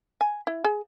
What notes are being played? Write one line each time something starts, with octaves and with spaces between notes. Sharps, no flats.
G#5
E4
G#4